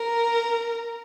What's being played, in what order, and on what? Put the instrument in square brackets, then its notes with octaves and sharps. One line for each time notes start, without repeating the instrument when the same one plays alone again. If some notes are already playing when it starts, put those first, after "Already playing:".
Already playing: [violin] A#4